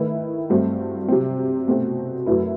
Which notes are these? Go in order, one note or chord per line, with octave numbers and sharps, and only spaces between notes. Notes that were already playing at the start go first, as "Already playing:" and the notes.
Already playing: D#3 A3 E4 B4
G2 F#3 A3 C4 F#4
C3 F#3 C4
B2 A3 C4 F#4
F#2 F#3 A3 E4 B4